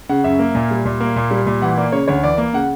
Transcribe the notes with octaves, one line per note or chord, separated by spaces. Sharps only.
C#3 F#5
F#2 E5
A#3
A#2
G3
A#2
A#3
A#2
G3
A#2
E3 F#5
A#3 D5
C#3 C#5
D2 C#5
E3 D5
A#3
C#3 F#5